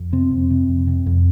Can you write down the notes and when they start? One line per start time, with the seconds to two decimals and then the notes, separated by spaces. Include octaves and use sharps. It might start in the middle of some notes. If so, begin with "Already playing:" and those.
Already playing: F2
0.12 C3 C4
0.31 F2
0.50 C3
0.69 F2
0.87 C3
1.06 F2